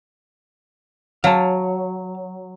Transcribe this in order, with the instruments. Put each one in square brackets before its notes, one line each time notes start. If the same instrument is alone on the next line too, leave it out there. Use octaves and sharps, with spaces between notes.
[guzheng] F#3 [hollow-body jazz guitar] F5 A5